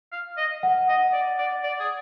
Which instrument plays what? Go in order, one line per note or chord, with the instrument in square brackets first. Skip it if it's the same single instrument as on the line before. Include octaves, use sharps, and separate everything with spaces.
[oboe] F5
D#5
[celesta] F#5
[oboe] D#5
D5
D5
D5
G#4